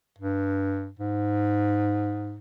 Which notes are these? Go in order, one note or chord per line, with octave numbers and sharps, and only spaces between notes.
G2
G#2